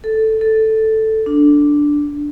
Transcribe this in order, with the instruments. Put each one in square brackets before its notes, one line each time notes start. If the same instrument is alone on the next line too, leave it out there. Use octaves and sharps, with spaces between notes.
[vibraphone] A4
A4
D4